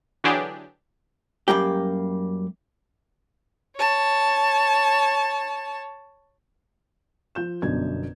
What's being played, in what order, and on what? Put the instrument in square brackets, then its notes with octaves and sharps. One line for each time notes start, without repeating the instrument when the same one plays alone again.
[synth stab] D3 E3 F#3 D4 G4 G#4
[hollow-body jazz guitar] F#2 G3 A#3 G4
[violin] C#5 A5
[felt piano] F3 G6 E7
G1 F#2 B2 D4 G#6